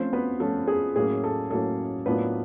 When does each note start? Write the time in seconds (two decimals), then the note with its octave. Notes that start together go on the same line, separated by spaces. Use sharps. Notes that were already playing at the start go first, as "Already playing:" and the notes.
Already playing: F3 A3 C4 C#4 F4 C5
0.13 B3 B4
0.40 F3 A3 C#4 F4 A4
0.67 G#4
0.96 A2 F#3 A#3 C#4 G#4
1.24 A4
1.50 A2 F#3 A#3 C#4 A4
2.06 A2 F#3 A#3 B3 D4 F4 B4